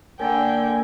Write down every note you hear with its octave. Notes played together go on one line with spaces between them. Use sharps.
D3 A#3 A#4 G5 G#5